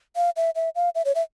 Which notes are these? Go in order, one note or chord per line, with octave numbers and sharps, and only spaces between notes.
F5
E5
E5
F5
E5
C#5
E5